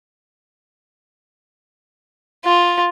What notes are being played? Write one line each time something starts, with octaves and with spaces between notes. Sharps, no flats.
F4